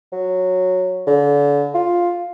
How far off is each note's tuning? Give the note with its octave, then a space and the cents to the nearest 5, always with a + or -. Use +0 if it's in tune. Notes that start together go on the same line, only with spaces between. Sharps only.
F#3 -5
D3 -35
F4 +5